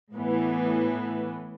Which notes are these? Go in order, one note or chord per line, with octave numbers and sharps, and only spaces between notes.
A2 E3 B3